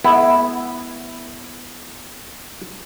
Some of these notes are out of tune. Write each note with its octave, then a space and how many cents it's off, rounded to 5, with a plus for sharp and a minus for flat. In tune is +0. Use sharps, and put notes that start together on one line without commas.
G#3 +45 B3 +0 E4 +0